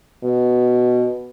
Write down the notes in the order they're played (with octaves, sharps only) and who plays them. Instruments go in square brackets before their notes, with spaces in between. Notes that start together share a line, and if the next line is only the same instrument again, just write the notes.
[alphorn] B2